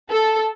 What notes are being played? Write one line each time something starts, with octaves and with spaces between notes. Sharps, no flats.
A4